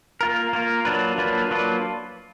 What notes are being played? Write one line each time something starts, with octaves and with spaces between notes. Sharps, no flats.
A#3 F4 A#4
A#3 F4 A#4
F#3 A#3 D4 F4 B4
F#3 A#3 D4 F4 B4
F#3 A#3 D4 F4 B4